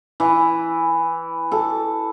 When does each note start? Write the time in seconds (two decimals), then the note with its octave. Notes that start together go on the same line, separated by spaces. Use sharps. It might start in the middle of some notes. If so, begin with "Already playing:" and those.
0.20 E3
1.52 A4